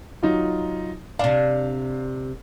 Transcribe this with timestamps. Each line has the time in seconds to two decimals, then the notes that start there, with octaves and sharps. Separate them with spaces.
0.23 F#3 D#4 F4
1.19 C3 D4 F5